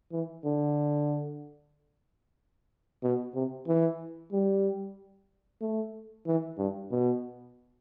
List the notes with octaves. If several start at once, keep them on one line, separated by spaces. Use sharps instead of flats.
E3
D3
B2
C3
E3
G3
A3
E3
G2
B2